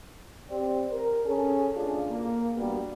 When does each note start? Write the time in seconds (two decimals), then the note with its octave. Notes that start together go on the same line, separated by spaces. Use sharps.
0.50 C4 G4 D5
0.92 A#4
1.25 C#4 G#4 A4
1.76 D2 D4 F4 G#4
2.11 A#3
2.57 G2 G3 B3 F#4